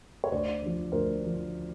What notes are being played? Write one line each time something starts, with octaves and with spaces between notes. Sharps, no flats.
C#5
D2 C5 D5
D3 F3
D2 A#4 C5
D3 F3